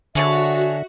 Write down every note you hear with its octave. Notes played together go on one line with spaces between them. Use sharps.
D3 F#4 G#4 C#5 E5 A5